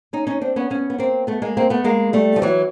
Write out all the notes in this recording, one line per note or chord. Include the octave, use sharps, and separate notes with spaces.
C#4 D#4
C#4 D#4
C4 D4
B3 C#4
B3 C#4
B3
A#3 C4
A3 B3
G#3 A#3
A#3 C4
A3 B3
G#3 A#3
G3 A3
F3
E3 F#3